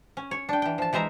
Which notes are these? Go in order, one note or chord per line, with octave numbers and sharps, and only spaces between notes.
C#4
C#5
D4 G5
E3 G5
F3 A5
E3 G#3 C5 E5 A#5